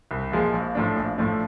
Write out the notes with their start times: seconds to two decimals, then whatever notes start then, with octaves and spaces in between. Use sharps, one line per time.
0.11 C2
0.32 A#2 F3 G#3
0.53 A#1
0.75 A2 F3 A3 D4
0.96 A#1
1.18 A2 F3 A3 D4